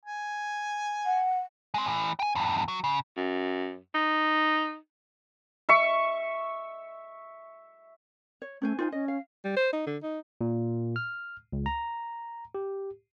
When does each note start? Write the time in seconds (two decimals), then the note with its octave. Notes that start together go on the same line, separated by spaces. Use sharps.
0.05 G#5
1.06 F#5
1.74 G#3 C4
1.88 A2 E3
2.19 G5 G#5
2.35 E2 G2
2.68 F#3
2.84 C#3
3.17 F#2
3.95 D#4
5.69 E5 C#6
8.42 C#5
8.62 A3 C#4 C5 G#5
8.79 D#4 F4 C5 G#5
8.92 C#4 D#5
9.08 F5
9.44 G3
9.56 C5
9.73 D#4
9.87 D3
10.03 D#4
10.41 A#2
10.96 F6
11.53 C#2
11.66 A#5
12.55 G4